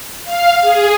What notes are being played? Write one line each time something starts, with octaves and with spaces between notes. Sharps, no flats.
F5
G#4